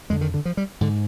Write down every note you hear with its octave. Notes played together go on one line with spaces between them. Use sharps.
F2 D3 G#3
D#3
D3
F3
G3
G#2 D3